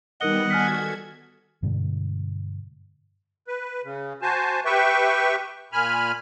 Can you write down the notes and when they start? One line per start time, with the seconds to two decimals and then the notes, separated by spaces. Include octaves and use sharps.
0.21 D#3 G3 B3 D#4 A#4 D#5 F#5 G7
0.50 F#4 A4 G#5 F6 G#6 B6
1.63 G2 B2 D3 G#3
3.47 B4
3.84 C#3
4.22 F#4 C5 G#5 A5
4.65 G4 B4 E5 G5 C#6
5.72 A#2 G#5 B5 F6